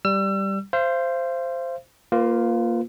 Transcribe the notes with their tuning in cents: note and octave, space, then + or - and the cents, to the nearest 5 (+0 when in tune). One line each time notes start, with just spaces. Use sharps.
G3 +0 E6 +35
C5 +0 F5 -40
A#3 +0 F4 +0 B4 +40